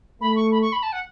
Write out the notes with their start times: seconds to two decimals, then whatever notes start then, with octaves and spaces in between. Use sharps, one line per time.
0.21 A3 B5
0.36 C#6
0.51 B5
0.62 C#6
0.72 B5
0.83 A5
0.92 F#5